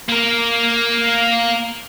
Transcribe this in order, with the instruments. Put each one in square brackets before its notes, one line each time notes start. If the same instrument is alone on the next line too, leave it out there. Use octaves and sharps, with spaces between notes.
[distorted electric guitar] A#3 A#4